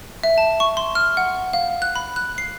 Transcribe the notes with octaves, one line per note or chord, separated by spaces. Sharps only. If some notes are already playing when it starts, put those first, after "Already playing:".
E5
A5
C#6
C6
F6
F#5
F5
F#6
B5
F#6
C7